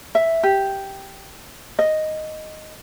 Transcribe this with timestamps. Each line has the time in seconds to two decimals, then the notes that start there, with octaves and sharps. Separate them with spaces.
0.15 E5
0.43 G4
1.79 D#5